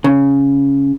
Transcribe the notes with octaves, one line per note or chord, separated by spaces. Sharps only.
C#3